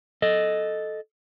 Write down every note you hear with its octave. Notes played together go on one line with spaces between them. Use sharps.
A4 D#5